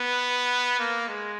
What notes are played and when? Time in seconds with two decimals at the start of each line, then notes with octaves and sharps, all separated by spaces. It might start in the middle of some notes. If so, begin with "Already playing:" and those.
Already playing: B3
0.79 A#3
1.09 G#3